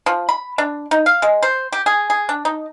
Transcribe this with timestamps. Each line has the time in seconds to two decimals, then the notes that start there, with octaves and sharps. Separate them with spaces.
0.06 F3
0.29 B5
0.58 D4
0.91 D#4
1.06 F5
1.22 G#3
1.43 C5
1.72 G4
1.86 G#4
2.10 G#4
2.29 D4
2.45 D#4